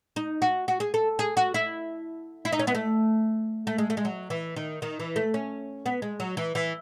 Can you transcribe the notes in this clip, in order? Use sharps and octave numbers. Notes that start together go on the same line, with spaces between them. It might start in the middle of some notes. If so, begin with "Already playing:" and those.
D#4
F#4
F#4
G#4
A4
G#4
F#4
E4
E4
D#4
C#4
B3
A3
A3
G#3
A3
G#3
F#3
E3
D#3
D#3
E3
A3
C#4
B3
G#3
F#3
E3
E3